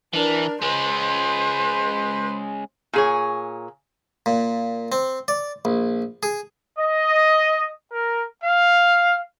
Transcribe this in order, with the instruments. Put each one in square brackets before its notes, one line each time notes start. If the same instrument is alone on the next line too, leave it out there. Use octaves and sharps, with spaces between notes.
[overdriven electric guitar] E3 [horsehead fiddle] D4 A#4
[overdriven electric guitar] G#3 C#4 [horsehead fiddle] B4 C5
[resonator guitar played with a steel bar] A#2 G#4 C#5
[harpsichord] A#2
C4
D5
A#1
G#4
[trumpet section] D#5
A#4
F5